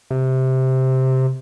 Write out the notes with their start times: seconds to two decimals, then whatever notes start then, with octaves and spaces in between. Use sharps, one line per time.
0.11 C3